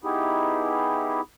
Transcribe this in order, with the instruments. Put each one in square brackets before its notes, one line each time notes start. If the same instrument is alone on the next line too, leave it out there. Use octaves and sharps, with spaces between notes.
[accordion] B3 D#4 E4 G4 G#4